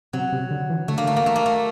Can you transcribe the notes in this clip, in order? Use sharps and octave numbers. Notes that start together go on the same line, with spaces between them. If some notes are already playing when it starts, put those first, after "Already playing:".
C3 F#3
C3
D3
E3
D3 A3
A#3
A3
A#3
A3
A#3
A3